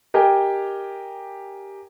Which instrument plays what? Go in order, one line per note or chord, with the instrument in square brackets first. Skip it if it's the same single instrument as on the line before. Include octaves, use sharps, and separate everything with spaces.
[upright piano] G4 A#4 D#5 G5 G#5